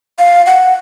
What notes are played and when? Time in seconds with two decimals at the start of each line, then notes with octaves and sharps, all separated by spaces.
0.19 F5
0.46 F#5